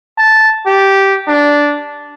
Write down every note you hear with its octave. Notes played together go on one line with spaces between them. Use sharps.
A5
G4
D4